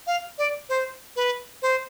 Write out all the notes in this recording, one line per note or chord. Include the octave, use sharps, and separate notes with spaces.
F5
D5
C5
B4
C5